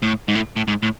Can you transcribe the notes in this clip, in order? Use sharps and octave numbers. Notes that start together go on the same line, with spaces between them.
A2
G#2
A2
A2
G#2
A2